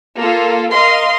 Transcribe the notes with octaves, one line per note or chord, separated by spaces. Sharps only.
A#3 F4 A4
A#4 D#5 F5 C6